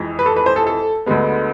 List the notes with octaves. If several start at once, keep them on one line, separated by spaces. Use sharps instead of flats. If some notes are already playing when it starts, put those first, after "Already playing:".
Already playing: F2 E3 G#3
B4
A4
B4
C5
A4
A4
D2 D3 G#3 B3